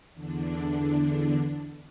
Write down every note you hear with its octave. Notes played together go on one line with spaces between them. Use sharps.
E2 D3 D4